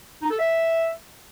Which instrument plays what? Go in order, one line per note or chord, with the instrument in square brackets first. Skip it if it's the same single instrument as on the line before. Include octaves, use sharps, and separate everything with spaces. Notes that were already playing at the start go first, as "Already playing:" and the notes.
[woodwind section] D#4
A4
E5